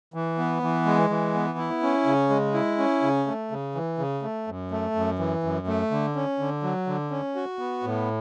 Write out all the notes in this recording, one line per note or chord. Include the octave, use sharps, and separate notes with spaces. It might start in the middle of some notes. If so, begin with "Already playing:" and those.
E3
B3
E3
G#3
E3
B3
E4
C#4
C#3
G#3
E4
C#4
C#3
A3
C#3
E3
C#3
A3
F#2
A3
F#2
E3
F#2
A3
D3
C#4
D3
F#3
D3
C#4
F#4
B3
A2